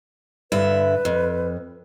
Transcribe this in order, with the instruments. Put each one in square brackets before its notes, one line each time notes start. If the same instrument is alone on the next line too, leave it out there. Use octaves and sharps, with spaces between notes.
[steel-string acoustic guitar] G2 D3 E5 [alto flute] B4
[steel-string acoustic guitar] F2